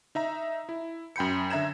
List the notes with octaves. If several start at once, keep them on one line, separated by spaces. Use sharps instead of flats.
D#4 E5 A#5
E4
F#2 G5 B5 G6 C#7
D3 E5 A#5 G#6 E7